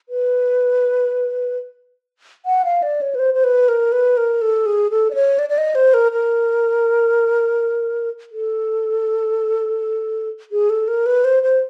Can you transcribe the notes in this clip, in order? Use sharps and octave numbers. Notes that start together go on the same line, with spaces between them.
B4
F#5
F5
D5
C#5
B4
C5
C5
B4
A#4
B4
A#4
A4
G#4
A4
D5
C#5
D5
D5
D#5
C5
A#4
A#4
A4
G#4
A4
A#4
B4
C5
C5